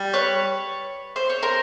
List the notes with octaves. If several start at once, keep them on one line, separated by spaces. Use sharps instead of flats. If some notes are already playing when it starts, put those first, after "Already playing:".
Already playing: G3
B4 C#5
C5
C#5
A#4 C5